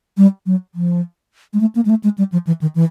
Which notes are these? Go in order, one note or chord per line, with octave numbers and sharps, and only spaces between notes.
G3
F#3
F3
G#3
A3
A#3
G#3
A3
G#3
G3
F3
E3
D#3
E3